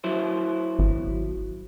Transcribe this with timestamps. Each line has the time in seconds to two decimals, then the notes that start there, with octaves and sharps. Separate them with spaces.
0.04 F#3 E4 C5
0.79 G#1